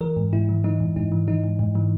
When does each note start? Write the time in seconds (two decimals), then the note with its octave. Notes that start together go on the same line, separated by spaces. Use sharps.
0.01 E3 A#4
0.17 G#2
0.33 G#2 E4
0.49 E3
0.64 E3 D#4
0.80 G#2
0.96 G#2 D#4
1.12 E3
1.28 E3 D#4
1.44 G#2
1.59 G#2
1.75 E3